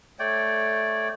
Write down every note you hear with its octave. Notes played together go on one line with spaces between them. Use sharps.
A3 C#5 D5 G5